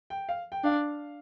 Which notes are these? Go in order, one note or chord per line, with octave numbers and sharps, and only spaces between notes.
G5
F5
G5
D4 F5